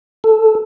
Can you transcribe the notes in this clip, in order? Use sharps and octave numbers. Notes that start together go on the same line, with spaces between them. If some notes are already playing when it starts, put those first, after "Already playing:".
A4